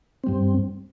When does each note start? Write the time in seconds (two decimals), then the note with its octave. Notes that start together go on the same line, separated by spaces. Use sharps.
0.24 G2 G3 C4